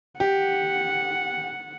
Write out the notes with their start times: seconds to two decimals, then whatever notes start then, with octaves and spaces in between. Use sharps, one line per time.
0.20 G4 F#5